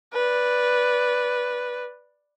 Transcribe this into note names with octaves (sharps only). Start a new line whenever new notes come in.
B4 D5